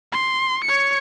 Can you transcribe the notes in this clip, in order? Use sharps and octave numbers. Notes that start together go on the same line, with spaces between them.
C6
C#5 C#7